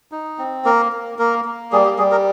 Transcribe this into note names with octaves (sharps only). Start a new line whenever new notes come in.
D#4
C4
A#3 A#4
A#3
A#3 A#4
A#3
G3 G#4
G4
G3 G#4
A#4